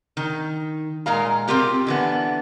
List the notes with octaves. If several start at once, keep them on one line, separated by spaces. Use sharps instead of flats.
D#3
A#2 G#3 A#4 F5 A#5
C4 C#4 F4 G4 A#4
D3 E3 B3